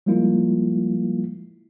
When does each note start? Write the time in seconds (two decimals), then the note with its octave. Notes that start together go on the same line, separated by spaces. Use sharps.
0.06 F3 G3 G#3 A#3 E4 F4